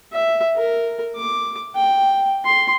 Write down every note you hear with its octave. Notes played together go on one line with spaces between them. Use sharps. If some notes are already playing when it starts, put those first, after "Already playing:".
E5
A#4
D6
G5
C6